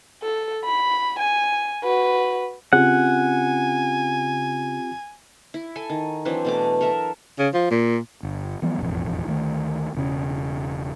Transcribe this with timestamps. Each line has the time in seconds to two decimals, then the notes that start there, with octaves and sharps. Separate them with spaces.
0.23 A4
0.65 B5
1.20 G#5
1.84 F#4 B4
2.73 C#3 C4 F4 G4 F#5 G#5
5.54 E4
5.76 A4 G#5
5.90 D#3
6.25 E3 F#3 C4 D4
6.45 B2 A3 D6
6.81 A4 A#4 E5
7.39 C#3
7.54 F3
7.71 A#2
8.23 G1
8.62 E3 F3 G3 B3
8.78 E1 A1 F2
9.26 D2 D#3 A3
9.94 E1 C#3 C#4